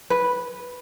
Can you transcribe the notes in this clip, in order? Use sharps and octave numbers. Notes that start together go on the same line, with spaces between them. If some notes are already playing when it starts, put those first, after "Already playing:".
B4